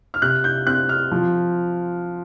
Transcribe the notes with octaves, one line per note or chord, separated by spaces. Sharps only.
F6
C3 F#6
G6
C4 F#6
F6
F3